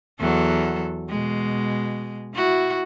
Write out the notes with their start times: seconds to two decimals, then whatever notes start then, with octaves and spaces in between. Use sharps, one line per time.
0.20 E2 F#3 A4
1.09 B2 G#3
2.34 E4 F#4